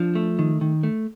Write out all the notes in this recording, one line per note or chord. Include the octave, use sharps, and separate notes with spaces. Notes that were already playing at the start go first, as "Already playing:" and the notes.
Already playing: F3 D4
A3
D#3
D#3
A3